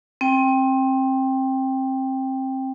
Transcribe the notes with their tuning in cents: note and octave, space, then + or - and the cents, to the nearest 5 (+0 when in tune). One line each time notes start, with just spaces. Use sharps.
C4 +25 G5 +5